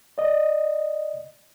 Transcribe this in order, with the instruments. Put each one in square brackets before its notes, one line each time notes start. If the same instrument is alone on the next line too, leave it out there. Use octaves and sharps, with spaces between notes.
[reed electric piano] D5 D#5